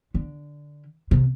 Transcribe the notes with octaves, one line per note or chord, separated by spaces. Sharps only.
D3
C3